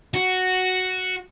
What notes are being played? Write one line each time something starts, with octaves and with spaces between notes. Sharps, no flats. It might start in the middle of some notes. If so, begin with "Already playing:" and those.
F#4